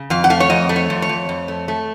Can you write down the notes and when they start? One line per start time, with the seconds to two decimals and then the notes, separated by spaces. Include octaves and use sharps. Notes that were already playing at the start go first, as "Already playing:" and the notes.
Already playing: C#3
0.10 F2 F5
0.24 F#5
0.30 A3 F5
0.40 C#5
0.50 F2 D#5
0.69 A3
0.76 C#5
0.90 F2
1.02 C#5
1.09 F2
1.29 F2
1.48 A3
1.68 A3